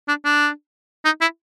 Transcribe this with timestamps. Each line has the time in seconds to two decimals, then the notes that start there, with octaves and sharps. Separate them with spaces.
0.08 D4
0.25 D4
1.05 D#4
1.21 E4